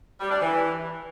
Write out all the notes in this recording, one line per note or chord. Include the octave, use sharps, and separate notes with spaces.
G3
D4
E3